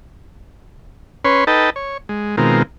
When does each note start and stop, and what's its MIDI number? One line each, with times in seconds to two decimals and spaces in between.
1.25 1.44 61
1.25 1.44 71
1.25 1.44 73
1.25 1.44 84
1.47 1.70 63
1.47 1.70 69
1.47 1.70 71
1.47 1.70 75
1.47 1.70 79
1.47 1.70 81
1.76 1.97 73
2.09 2.36 56
2.37 2.62 47
2.37 2.62 51
2.37 2.62 56
2.37 2.62 60
2.37 2.62 65
2.37 2.62 70